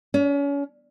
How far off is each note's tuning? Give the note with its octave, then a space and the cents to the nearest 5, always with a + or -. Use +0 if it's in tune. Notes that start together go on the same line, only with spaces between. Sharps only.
C#4 +35